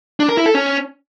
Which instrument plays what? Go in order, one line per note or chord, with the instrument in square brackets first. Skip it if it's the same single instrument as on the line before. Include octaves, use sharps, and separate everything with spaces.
[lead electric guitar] D4
A#4
E4
A4
C#4